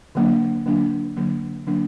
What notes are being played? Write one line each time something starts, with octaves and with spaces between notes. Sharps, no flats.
D3 F#3 A#3 D4
D3 F#3 A#3 D4
D3 F#3 A#3 D4
D3 F#3 A#3 D4